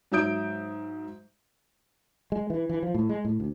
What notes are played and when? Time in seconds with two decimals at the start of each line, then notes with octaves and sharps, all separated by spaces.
0.12 G#2 F#3 E5 D#6 G6 D7
2.32 G#3
2.50 E3
2.69 E3
2.83 F3
2.95 A2
3.09 G#3
3.25 A2
3.40 D2